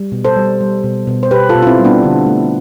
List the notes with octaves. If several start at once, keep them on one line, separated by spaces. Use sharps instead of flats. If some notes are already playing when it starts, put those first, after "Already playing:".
Already playing: G3
B2
A4 C5
G3
G3
B2
B2
C5
B2 G4 B4
F4 A4
B2
F4
C4 E4
G3
B3 D4
D3
A3